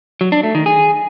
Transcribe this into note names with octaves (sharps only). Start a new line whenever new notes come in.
F#3
D4
A3
D#3
G#4